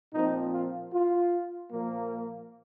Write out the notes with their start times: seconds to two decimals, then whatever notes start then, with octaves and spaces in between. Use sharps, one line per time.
0.13 A#2 F3 C4 D#4
0.52 F4
0.92 F4
1.70 A#2 F3 A#3